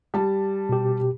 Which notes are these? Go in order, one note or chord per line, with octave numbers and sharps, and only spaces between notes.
G3 A5
B2 G4